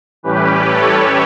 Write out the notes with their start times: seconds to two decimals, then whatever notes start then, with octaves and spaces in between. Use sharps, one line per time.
0.23 A2 E3 G3 C#4 G4 B4
0.70 A4 C#5